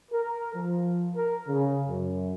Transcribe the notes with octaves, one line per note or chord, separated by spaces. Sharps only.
A#4
F3
A#4
C#3
F#2